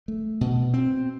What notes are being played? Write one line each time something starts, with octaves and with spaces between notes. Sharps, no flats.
A3
B2
C4